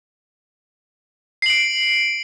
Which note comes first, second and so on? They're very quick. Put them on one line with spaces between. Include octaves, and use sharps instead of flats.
C7 F#7 D7